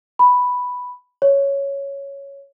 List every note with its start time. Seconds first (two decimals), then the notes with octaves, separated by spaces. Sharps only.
0.19 B5
1.22 C#5